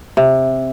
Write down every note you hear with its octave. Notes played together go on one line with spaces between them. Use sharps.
C3